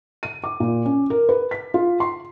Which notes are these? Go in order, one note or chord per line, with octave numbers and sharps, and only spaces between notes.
D#7
D6
A#2
C#4
A#4
B4
B6
F4
C6